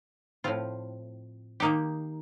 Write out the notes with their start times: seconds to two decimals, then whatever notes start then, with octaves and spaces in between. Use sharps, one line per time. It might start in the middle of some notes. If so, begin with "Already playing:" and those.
0.44 A2 F3 C4 F4
1.60 D#3 A#3 D#4 G4